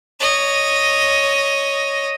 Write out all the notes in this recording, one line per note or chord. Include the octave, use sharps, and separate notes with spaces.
C#5 D#5